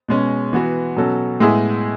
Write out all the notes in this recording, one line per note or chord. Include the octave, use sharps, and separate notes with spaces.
B2 G#3 C#4
E3 B3 F#4
B2 F#3 C#4 F#4 A4
A2 G#3 B3 E4 G#4